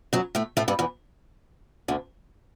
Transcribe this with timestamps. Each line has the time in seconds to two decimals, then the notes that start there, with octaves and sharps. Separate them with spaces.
0.13 F#2 F#3
0.35 A2 A3
0.57 A2 A3
0.68 G2 G3
0.79 E2 E3
1.88 D2 D3